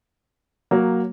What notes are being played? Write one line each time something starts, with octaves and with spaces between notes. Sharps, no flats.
F#3 A#3